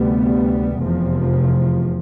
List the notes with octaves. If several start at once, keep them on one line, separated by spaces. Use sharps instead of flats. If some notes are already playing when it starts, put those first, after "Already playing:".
Already playing: D2 C3 G3 B3
F1 E2 C3 F3